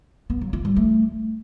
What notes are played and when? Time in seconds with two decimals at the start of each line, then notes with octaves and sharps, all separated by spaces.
0.30 B3
0.41 F#3
0.53 F4
0.65 G3
0.76 A3